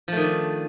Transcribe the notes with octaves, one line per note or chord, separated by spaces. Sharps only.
D#3 F3 A3 D4